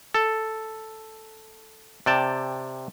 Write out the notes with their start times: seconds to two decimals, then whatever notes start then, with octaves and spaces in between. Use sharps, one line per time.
0.15 A4
2.06 C3 D5 G5 A5